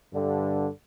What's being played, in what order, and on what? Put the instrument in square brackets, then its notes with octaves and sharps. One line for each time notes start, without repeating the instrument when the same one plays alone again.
[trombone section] G2 D3